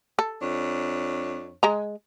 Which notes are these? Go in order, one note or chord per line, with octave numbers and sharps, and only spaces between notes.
A4
F2 D4 C#5
G#3 A#5